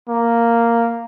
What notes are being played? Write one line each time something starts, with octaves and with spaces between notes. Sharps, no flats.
A#3